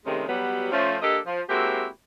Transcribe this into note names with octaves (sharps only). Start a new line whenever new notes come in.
G2 C3 D#3 G#3 A3 C#4
F#3 G3 B3
F3 A3 C#4
A#3 D4 G4 A4 D#5
F3
G#3 A#3 C4 E4 F#4 G4